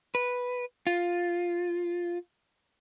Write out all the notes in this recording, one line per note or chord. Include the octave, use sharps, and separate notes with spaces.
B4
F4